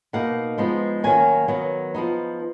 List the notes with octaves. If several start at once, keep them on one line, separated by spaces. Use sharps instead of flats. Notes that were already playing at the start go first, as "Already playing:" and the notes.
B2 A#3 D#4 F#5
F3 G#3 B3 D#4
D#3 F#3 A#3 C#4 G#5
D#3 F#3 B3
F3 B3 D#4